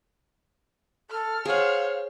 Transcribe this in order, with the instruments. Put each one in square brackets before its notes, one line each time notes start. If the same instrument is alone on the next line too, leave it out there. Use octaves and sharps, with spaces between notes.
[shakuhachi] A4 [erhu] F6
[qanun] G#4 F#5 [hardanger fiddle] C5 C#5 [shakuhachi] F5